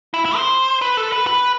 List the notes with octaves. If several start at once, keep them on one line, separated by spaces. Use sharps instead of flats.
E4
E4
C5
B4
A4
B4
B4